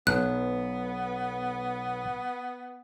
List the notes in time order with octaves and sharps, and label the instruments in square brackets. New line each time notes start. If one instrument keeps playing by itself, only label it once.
[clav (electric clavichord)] B1 [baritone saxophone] B3 [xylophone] F#6